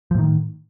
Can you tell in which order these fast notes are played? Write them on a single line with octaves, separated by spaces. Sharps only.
F3 A2 D#3